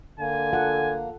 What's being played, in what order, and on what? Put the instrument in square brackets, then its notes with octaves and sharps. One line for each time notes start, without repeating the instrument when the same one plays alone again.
[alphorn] D3 [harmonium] A#3 [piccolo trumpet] G#5
[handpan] F4 A4 F#5